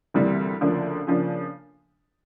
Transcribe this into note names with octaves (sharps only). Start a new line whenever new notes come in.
D2 C3 E3 G3 A#3
D2 C#3 F3 A#3 D4
C#3 F3 A#3 D4